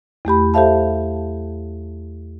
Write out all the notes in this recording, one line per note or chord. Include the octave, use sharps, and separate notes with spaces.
E2 A3 G4 B5
G4 A4 C5 E5 F5 A5